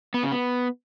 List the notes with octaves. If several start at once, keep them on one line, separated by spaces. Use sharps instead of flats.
B3
C#3
B3